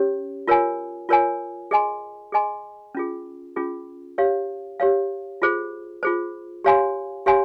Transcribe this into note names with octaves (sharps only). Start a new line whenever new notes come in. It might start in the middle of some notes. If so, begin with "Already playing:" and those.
Already playing: C#4 G4 C#5
F4 A#4 C#5 G#5
F4 A#4 C#5 G#5
G#4 D#5 G#5 C6
G#4 D#5 G#5 C6
C#4 F4 G#4
C#4 F4 G#4
G4 C#5 F5
G4 C#5 F5
F4 G#4 C5
F4 G#4 C5
G4 C#5 F5 G#5 C6
G4 C#5 F5 G#5 C6